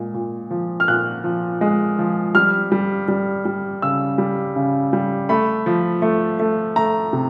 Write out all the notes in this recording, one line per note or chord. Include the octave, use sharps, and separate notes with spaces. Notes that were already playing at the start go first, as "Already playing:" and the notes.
Already playing: A#2 G#3
A#2
F3
F6
A#2 F#6
F3
G#3
F3
G3 F6
G3
G3
G3
C#3 E6
G3
C#3
G3
A3 B5
F3
A3
A3
A3 A#5
C3